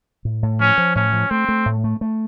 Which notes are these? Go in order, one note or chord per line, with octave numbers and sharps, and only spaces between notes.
A2
A2
F3 C#4
F3
A2 C#4
F3
A3 C4
A3
A2
A3
A3